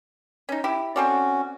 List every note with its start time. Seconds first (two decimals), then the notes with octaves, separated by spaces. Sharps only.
0.49 C#4 D#4
0.64 E4 G4
0.96 C4 C#4 F#4 A4 D5